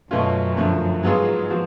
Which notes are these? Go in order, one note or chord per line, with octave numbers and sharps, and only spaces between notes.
F#2 B2 A3 C#4 F4
D3 F3 A3
G#2 F#3 B3 F4 G#4
F3 B3 F#4